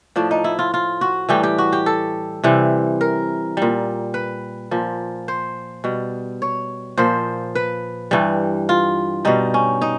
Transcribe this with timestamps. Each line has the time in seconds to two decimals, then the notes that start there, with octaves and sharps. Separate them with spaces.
0.16 A2 F3 D4
0.31 D#4
0.44 E4
0.59 F4
0.74 F4
1.01 F#4
1.29 A2 E3 G3 G4
1.43 G4
1.58 F#4
1.73 G4
1.86 A4
2.44 C3 E3 G3
3.01 A#4
3.57 A#2 G3
4.14 B4
4.71 A#2 F3
5.28 C5
5.84 B2 G3
6.42 C#5
6.98 A#2 F3 C5
7.55 B4
8.11 G2 E3 G3
8.69 F4
9.25 B2 G3 D#4
9.54 C#4
9.82 D#4